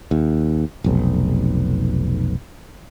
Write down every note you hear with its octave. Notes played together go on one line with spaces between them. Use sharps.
D#2
F1 B1